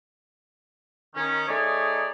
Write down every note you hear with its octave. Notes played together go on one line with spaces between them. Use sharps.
D#3 C#4
A3 D#4 G#4 C#5 D5 G#5